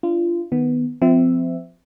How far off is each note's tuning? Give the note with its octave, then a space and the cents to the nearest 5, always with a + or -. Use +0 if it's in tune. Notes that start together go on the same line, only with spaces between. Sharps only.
D4 +0 F4 -30
D#3 +0 B3 +0
F3 +0 C4 -30 E5 +0